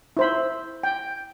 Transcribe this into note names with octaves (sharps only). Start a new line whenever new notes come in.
E4 C5 B5
G5